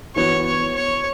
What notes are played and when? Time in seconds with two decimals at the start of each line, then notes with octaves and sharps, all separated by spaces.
0.15 E3 B3 F#4 C#5
0.45 C#5
0.74 C#5